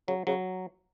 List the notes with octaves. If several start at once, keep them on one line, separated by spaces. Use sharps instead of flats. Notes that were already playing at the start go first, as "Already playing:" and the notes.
C#3 F#3
C#3 F#3